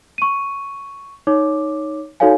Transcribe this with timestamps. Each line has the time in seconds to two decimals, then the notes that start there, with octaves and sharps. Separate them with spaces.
0.18 C#6 D#7
1.27 D#4 C#5 D6
2.20 D#4 F#4 A4 C#5 F5 G#5